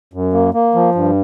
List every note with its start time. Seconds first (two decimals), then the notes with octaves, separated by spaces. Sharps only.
0.14 F#2
0.33 A#3
0.54 A#3
0.75 F3
0.95 G2